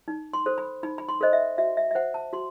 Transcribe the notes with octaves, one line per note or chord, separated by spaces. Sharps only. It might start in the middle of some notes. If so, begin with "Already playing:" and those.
D#4
C6
A4 C5
B5
D#4 B5
B5
C6
A4 C5 D#5
E5
F#4 E5
E5
E5
C5 F#5
A5
F#4 C6